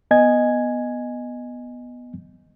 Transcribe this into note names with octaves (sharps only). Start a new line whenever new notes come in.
B3 D#5 G#5 G#6